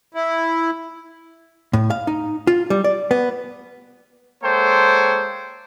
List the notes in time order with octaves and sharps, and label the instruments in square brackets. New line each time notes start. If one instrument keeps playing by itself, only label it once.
[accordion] E4
[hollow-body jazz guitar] A2
F5
D#4
F4
G3
D5
B3
[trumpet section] G#3 A#3 A4 C5 C#5 G5